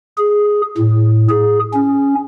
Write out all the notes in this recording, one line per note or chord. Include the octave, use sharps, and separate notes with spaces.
G#4
A2
G#4
C#4